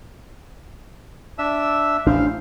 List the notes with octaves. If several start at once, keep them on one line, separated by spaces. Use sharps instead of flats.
D4 E5 E6
A1 D4 C5 F5